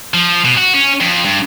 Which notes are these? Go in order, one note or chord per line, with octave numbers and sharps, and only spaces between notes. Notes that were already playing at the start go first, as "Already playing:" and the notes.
F3
B2
F#4
C#4
F2
G2